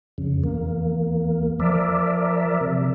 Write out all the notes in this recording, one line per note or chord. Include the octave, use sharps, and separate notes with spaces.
F2 C#3
E2 A#3
F3 A#4 D5 E5
C3